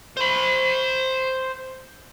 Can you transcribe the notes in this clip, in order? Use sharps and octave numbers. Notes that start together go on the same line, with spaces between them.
C5 B5